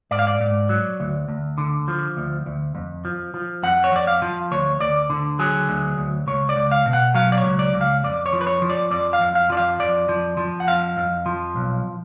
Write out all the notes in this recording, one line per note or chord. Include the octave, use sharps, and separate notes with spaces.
G#2 D5
F5
D5
G#2
F#3
D2
D2
D3
F3
D2
D2
F2
F3
F3
F2 F#5
C#5
F2 D5
F5
F3
D2 C#5
D2 D5
D3
F#3 G#4
D2
D2
C#2 C#5
D5
C#2
F5
B2
F#5
F#3 F5
D5
C#5
C#2
D5
C#2
F5
F2 D5
C#5
F3
B4
C#5
F3
D5
F2 D5
F5
F2
F5
F3 D5
F5
F2 D5
F3
F3
F#5
F2 F5
F2
F3
B1